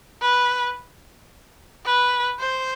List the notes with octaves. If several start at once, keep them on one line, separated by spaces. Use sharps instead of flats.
B4
B4
C5